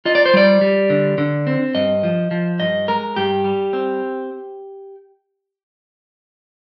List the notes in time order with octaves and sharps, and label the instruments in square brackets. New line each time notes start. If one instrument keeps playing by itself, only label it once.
[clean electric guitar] F4 D#5
D5
C5
G3 D5
G3
D3
D3
C4
G2 D#5
F3
F3
G2 D#5
G#3 A#4
G2 G4
G3
C4